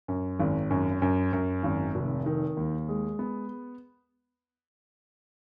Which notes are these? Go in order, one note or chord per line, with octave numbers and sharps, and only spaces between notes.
F#2
G#1
F#2
F#2
F#2
G#1
F1
D#3
D#2
G#3
B3